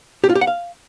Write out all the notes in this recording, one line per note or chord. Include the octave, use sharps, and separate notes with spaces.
G4
F4
G4
F#5
F5